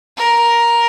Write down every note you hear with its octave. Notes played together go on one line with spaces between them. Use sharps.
A#4